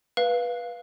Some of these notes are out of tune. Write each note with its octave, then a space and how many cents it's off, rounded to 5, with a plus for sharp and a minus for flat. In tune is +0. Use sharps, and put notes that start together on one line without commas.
B4 -20 F5 +0